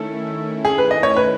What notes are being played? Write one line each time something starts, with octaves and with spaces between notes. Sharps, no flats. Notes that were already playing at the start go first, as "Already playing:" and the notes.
Already playing: D#3 A3 C#4 E4 A4
G#4
B4
D#5
C#5
B4